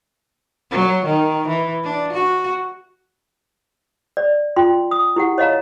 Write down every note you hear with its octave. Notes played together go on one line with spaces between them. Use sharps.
F#3
D#3
E3
D4
F#4
D5
F4 G5 C6
D#6
E4 G4 F#5
C#5 D#5 F5 A#5